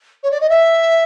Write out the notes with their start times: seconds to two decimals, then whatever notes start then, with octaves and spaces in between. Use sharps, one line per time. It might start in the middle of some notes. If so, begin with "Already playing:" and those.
0.23 C#5
0.31 D5
0.41 D#5
0.49 E5